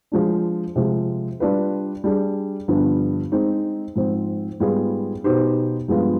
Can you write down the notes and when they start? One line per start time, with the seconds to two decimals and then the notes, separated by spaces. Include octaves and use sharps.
0.12 F3 G#3 D4
0.76 C3 F3 G#3
1.40 G3 D4 F4 B4
2.04 G3 D4 G#4
2.68 G2 D3 F3 B3
3.32 G#3 C4 D#4
3.96 G#2 F3 C4
4.60 G#2 G3 B3 F4 G#4
5.24 B2 B3 D#4 G4 C5
5.88 G2 F3 G#3 B3 F4